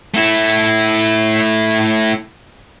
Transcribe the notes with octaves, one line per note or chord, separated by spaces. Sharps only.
A3 E4